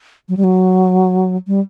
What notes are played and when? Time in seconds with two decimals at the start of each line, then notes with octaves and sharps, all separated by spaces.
0.29 F#3
0.37 G3
0.44 F#3
1.47 G3